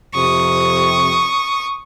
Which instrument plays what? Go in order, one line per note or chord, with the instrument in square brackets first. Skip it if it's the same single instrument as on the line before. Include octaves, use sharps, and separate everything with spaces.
[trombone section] F2 C3 [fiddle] C#6 D#6